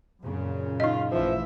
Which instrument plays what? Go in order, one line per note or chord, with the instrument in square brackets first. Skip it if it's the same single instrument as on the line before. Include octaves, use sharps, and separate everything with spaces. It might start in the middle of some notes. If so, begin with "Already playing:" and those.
[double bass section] F#2 A#2 C#3
[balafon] D#4 D#5 [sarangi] F4
[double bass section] A1 E3 [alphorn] F3 [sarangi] E5